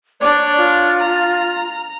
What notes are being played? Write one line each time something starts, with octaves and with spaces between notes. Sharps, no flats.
D4 C#5 D5
F4
A#5